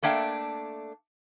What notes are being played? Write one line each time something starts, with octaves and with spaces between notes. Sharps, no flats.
A3 A#3 D4 E5 G5